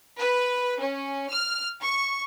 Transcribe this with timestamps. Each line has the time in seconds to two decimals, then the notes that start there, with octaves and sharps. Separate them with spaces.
0.18 B4
0.80 C#4
1.31 F6
1.81 C#6